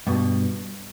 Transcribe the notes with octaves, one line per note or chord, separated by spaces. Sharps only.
G2 B2